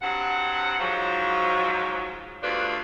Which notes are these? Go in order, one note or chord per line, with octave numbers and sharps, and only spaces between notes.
G2 F#3 C4 F#5
G#2 F3 F#3
D2 G2 D4 F4 B4 C5